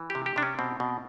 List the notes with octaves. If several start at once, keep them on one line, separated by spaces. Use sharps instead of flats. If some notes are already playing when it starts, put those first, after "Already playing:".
Already playing: E3
G4
C3
G4
C3 D4
C#4
B2 C4
B2